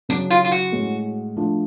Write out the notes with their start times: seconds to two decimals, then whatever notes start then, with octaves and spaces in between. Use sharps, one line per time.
0.09 C#3 F#3 C#4 D4
0.30 F4
0.44 F4
0.52 F#4
0.72 A2 G#3 C#4
1.37 F3 A3 D4